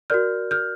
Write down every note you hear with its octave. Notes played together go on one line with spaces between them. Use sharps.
F#4 A#4 D5 F6 G6
F6 G6